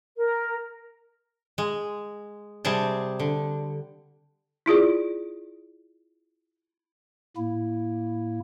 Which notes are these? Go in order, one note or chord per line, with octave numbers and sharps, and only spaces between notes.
A#4
G#3
C3 G3 G#4 A5
D3
E4 F4 G#4 D5
A2 A#3 E4